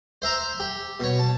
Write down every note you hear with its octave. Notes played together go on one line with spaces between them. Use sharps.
C5 E5 A#5 C6
G4
B2 C#5
A5